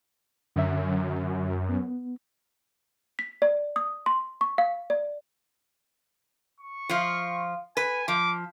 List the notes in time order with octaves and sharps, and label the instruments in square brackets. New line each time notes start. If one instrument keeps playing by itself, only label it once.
[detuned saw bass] F#2 [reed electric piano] D3 E5
[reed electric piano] B3
[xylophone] B6
D5
D#6
C6
C#6
F5
D5
[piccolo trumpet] C#6
[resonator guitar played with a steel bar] F3 F4
[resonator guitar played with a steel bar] B4 [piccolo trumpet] G#5
[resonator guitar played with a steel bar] F3 [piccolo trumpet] D6